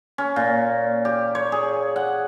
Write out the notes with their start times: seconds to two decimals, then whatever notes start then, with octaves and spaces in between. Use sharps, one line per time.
0.18 C#4
0.36 A#2
1.05 G4
1.35 C#5
1.52 G#4
1.96 F#5